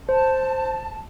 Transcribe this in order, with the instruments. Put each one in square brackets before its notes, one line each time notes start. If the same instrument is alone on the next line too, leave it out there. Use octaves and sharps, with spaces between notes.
[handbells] C5 [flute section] A5